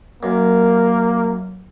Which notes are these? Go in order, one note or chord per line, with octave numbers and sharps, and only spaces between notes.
F#2 A#3